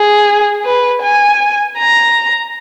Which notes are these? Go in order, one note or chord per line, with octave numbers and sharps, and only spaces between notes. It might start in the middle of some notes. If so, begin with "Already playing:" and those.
Already playing: G#4
B4
G#5
A#5